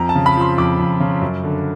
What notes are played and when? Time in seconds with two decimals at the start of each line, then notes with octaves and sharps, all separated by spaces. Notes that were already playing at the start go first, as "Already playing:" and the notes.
Already playing: F2 A#5
0.09 A5
0.15 C#3
0.26 B5
0.36 F3 C6
0.58 F2 D6
0.79 F2
1.00 C#3
1.21 F#2
1.44 D3